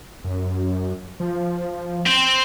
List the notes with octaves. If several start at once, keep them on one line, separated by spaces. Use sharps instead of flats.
F#2
F3
C4